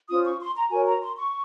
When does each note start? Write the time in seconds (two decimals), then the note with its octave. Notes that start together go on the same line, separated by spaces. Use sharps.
0.09 C#4 F4 C5 D#6
0.25 C#6
0.40 C6
0.55 A#5
0.71 F#4 A#4 C#5 G#5
0.86 A#5
1.02 C6
1.17 C#6